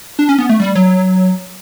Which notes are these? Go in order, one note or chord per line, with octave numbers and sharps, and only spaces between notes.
D4
C#4
B3
A3
G3
F#3